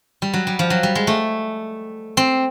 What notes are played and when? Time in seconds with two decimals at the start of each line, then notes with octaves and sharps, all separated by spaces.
0.22 G3
0.34 F#3
0.47 G3
0.59 F3
0.70 F#3
0.83 G3
0.95 G#3
1.07 A3
2.17 C4